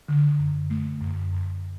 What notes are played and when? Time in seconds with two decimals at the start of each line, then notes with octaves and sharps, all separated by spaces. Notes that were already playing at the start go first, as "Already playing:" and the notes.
0.08 D3
0.39 F#2
0.70 A3
1.01 F#2
1.33 F#2